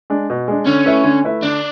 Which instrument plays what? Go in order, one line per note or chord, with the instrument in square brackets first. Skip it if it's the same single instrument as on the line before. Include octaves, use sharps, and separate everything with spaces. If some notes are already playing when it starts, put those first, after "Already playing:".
[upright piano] G#3 D4
B2
G#3 D4
[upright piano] D3 [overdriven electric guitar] C#4
[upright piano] A3 E4 B4 E5
D3
A3 E4 B4 E5
[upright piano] D3 [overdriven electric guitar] D4